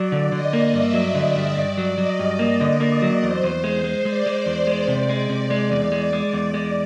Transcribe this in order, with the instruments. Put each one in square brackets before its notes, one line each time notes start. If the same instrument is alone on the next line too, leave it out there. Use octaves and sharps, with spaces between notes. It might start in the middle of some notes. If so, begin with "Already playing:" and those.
Already playing: [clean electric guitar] F#3 [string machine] D5
[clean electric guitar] D3
[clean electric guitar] D3 [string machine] D#5
[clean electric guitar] A#3
[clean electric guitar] G2 [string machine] E5
[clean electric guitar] F#3
[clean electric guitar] D3 [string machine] D#5
[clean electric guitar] G2
[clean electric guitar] G2 [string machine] D5
[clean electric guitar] F#3
[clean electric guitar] F#3 [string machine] D#5
[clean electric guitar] G2
[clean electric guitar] A#3 [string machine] D5
[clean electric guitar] D3
A#3
F#3
[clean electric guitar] E2 [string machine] C5
[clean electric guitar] E2
[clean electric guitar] G#3 [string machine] C5
[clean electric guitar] G#3
[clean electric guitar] G#3 [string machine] D5
[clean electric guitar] G#3
[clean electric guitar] E2 [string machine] D5
[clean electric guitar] G#3
[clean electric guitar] C3 [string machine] D5
[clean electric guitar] G#3
[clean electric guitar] C3 [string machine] D5
[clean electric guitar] G#3
[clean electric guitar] E2 [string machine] D5
[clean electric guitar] G#3
G#3
E2
G#3